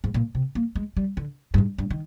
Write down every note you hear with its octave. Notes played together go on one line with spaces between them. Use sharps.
G#2
A#2
C3
A#3
G#3
G3
D3
G2
G#2
G2
D#3